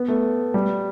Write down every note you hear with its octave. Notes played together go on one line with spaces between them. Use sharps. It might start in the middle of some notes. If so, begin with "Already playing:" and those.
Already playing: B3
A3
G3